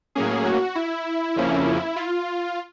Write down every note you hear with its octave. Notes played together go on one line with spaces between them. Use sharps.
A2 F#3 A#3 C#4 G#4
F#4
E4
F2 C#3 F3 A#3 C#4
F4